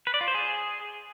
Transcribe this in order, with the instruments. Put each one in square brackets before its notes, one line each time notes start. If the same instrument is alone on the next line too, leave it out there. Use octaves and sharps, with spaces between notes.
[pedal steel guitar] B4
D5
F4
C5
G#4